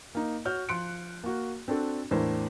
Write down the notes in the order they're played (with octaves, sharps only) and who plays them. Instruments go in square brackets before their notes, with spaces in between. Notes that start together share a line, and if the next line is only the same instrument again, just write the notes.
[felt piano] A#3 D#4
F#4 C#5 F6 G6
F3 C6 F#6 C#7 D7
A#3 F#4
C4 D4 F#4 A4
E2 A2 D4 E4 A#4 C5